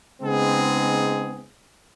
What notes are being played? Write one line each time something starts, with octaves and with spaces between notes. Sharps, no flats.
C#3 G#3 B3 C4 D#4 G#4